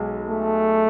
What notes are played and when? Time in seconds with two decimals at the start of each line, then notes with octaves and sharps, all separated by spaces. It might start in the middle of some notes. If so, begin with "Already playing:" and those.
Already playing: B1 G#3
0.30 A3